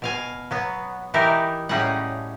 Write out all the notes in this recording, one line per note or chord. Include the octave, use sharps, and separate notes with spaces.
B2 F5 G#5
F#3 B3
E3 D#4 E4 G4 A#4
A2 G3 C#4 D#4 G#4 F#5